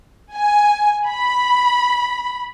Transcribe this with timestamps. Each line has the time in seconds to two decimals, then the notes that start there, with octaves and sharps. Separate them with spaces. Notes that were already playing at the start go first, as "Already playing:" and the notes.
0.34 G#5
1.08 B5